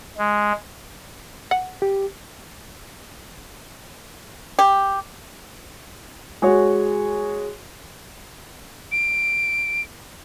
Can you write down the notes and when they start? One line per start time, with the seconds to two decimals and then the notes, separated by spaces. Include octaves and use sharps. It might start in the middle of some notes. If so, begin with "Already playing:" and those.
0.18 G#3
1.51 F#5
1.82 G4
4.59 G4
6.42 G#3 F#4 C#5
8.92 D7